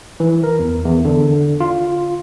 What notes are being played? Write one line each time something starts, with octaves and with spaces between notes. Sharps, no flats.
E3
A#4
E2
E2
D3
F4